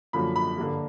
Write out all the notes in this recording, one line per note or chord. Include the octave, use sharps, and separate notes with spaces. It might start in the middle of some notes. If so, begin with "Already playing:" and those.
F#2 D3 F3 A#3 B5
B5
G2 D3 G3 A#3